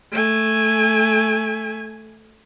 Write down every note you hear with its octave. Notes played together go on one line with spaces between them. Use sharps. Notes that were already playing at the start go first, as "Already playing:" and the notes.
A3 G#5